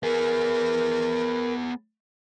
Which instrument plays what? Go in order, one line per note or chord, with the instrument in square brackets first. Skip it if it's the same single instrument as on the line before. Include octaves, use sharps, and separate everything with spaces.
[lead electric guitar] B3 G#4 [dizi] A#4